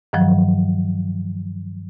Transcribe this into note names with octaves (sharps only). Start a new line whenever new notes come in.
G2 D#3 F3 F#3